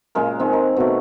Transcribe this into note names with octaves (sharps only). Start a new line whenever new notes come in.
A#2 C#3 G#3 A#4
D#3 G#3 C4
A#4
B2 A3